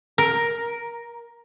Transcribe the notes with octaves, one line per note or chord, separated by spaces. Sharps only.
A#4